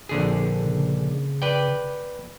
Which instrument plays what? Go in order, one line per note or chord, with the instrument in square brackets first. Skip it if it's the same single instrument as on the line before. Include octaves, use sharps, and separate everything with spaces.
[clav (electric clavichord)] A#1 D3 G#4
[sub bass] C#3
[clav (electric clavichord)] B4 D5 G5